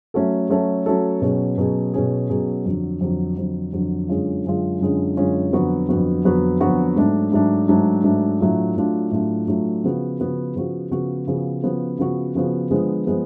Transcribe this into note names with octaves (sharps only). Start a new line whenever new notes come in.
F#3 A3 C#4 F#4 A4
F#3 A3 C#4 F#4 A4
F#3 A3 C#4 F#4 A4
B2 F#3 C#4 G#4
B2 F#3 C#4 G#4
B2 F#3 C#4 G#4
B2 F#3 C#4 G#4
F2 D3 F#3
F2 D3 F#3
F2 D3 F#3
F2 D3 F#3
F#2 D3 G#3 C#4 F4
F#2 D3 G#3 C#4 F4
F#2 D3 G#3 C#4 F4
F#2 D3 G#3 C#4 F4
F2 D3 F#3 B3 F#4
F2 D3 F#3 B3 F#4
F2 D3 F#3 B3 F#4
F2 D3 F#3 B3 F#4
G#2 F#3 A3 D4
G#2 F#3 A3 D4
G#2 F#3 A3 D4
G#2 F#3 A3 D4
A2 F#3 A3 D4 F4
A2 F#3 A3 D4 F4
A2 F#3 A3 D4 F4
A2 F#3 A3 D4 F4
C#3 F3 B3 F#4
C#3 F3 B3 F#4
C#3 F3 B3 F#4
C#3 F3 B3 F#4
C#3 F3 B3 F#4
C#3 F3 B3 F#4
C#3 F3 B3 F#4
C#3 F3 B3 F#4
D3 F3 G#3 B3
F3 G#3 B3